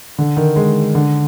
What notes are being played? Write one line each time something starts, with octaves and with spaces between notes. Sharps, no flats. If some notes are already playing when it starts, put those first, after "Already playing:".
D3
D#3
G#3
D3